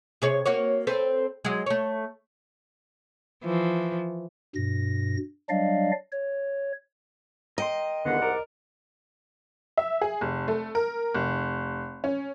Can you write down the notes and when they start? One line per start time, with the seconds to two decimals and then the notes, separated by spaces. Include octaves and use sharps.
0.22 C3 G#4 C#5
0.46 A#3 F#4 C#5
0.87 C4 A4 B4
1.45 F#3 G#3
1.66 A3 C#5
3.44 E3 F3
4.55 G2 B2 A#6
5.49 F#3 G3 D4 D5 D#5 F5
6.12 C#5
7.58 A#4 D#5 G5 C6
8.05 C2 G#2 D3 D#3 B3 F4 F#5
8.21 A#4 D5
9.77 E5
10.01 G#4
10.21 F1
10.48 A3
10.75 A#4
11.14 F1
12.04 C#4